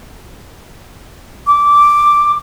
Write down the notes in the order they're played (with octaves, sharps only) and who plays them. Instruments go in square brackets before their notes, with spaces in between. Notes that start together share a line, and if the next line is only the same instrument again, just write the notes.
[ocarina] D6